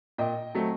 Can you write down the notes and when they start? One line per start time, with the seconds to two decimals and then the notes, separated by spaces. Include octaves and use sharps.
0.18 A#2 D#5 G5
0.55 F#3 A3 C4